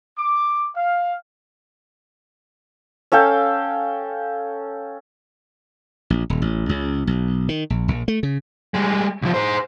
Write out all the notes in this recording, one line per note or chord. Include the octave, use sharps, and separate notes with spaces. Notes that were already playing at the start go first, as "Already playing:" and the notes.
D6
F5
C#4 A4 F5 G5
A#1
D#1
A1
C#2
B1
D#3
A#1
A#1
A3
C#3
G3 G#3
C2 F3
G#4 C5